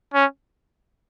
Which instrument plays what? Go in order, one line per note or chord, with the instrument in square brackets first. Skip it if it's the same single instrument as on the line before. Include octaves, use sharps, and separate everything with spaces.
[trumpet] C#4